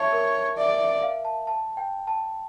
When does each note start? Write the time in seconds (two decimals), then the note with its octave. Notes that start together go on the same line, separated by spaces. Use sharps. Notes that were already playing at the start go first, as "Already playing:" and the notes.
Already playing: C#5 E5 A5
0.13 A#4
0.57 D5 E5
0.80 E5
1.02 F5
1.25 A5
1.47 A5
1.77 G5
2.07 A5